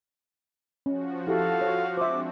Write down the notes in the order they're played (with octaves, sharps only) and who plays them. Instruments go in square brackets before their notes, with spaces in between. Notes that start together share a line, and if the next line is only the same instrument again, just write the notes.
[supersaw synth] F3 F#4 [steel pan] C#4
[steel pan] E4 G4 [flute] A4 [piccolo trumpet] F5
[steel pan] C#5
[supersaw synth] G#3 C4 D4 [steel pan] C5 E5 [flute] D6